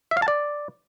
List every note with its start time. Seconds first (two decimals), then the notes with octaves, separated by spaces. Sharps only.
0.11 E5
0.17 F5
0.22 A5
0.28 D5